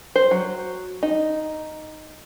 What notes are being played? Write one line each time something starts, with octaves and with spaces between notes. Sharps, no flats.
C5
F#3
D#4